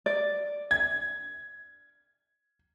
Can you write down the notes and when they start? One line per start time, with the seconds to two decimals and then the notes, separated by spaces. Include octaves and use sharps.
0.06 D5
0.71 G#6